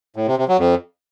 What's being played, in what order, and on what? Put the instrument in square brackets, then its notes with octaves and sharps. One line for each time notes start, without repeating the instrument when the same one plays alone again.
[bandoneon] A2
C3
C3
F#3
F2